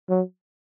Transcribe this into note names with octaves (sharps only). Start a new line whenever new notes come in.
F#3